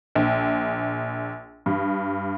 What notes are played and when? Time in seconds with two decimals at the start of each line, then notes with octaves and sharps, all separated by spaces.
0.15 A#1
1.66 G2